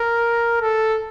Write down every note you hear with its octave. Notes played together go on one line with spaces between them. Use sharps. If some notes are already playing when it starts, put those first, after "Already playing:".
Already playing: A#4
A4